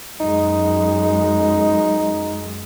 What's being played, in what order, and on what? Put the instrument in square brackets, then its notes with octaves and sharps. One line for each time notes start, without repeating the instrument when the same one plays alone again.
[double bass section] F#2 G#3 [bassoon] D#4